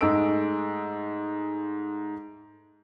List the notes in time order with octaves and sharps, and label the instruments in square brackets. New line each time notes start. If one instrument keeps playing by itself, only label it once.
[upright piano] G#2 G#3 A3 E6 D7